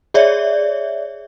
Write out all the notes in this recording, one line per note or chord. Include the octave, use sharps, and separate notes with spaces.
G#4 C#5 D5 E5